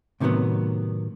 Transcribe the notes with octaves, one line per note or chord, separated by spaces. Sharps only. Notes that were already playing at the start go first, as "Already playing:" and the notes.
A2 C3 D#3 E3 F#3 B3